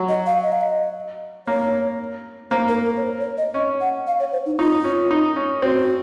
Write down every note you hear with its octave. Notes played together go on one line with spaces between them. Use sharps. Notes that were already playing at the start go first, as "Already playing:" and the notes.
Already playing: F#3
D#5
F5
D#5
F5
D#5
A#3 C#5
A#3 C5
A#4
A#4
C#5
C5
C#5
D#5
C#4 D#5
F#5
F5
C#5
C5
D#4
D#4 F4
C#4
D#4
C#4
C4 F#4